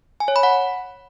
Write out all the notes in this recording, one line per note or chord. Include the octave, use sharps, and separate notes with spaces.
G#5
C#5
B5
F#5